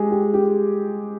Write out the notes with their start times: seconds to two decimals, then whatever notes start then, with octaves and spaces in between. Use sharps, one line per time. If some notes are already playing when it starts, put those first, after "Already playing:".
Already playing: G#3 G4 G#4
0.11 G4
0.34 G4